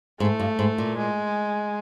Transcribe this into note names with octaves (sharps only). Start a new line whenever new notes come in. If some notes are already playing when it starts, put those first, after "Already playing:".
G#2 A3
G2
G#2
A#2
G#3